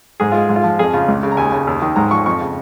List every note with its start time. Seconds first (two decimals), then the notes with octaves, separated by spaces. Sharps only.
0.20 G#2 G#4
0.32 G#3 F4
0.49 G#2
0.56 F4
0.64 F3
0.79 F2 G#4
0.93 C#3 F4
1.08 C#2
1.23 C#3
1.32 A#5
1.37 D#2 G#5
1.52 C#3
1.67 D#2
1.82 D#3
1.96 G#2 A#5
2.11 F3 C#6
2.26 F2 C#6
2.41 C#3